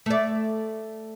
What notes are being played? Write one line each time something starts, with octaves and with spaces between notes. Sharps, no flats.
A3 D5